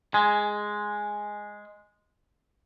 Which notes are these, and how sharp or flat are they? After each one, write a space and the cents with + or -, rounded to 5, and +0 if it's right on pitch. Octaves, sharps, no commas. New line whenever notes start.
G#3 +0 G#5 +20